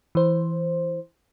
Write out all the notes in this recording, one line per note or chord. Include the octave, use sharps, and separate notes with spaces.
E3 C5